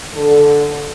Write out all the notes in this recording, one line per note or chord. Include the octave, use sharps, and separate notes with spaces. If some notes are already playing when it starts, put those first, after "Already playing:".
D3 A4